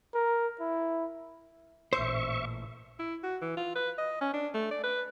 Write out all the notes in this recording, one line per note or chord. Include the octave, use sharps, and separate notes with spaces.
A#4
E4
A1 A#2 C5 E5 C#6
E4
F#4
E3
F4
B4
D#5
C#4
D4
A3
D5
B4